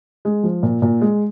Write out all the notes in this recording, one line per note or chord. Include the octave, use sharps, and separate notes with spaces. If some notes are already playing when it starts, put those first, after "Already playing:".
G#3
F3
A#2
A#2
G#3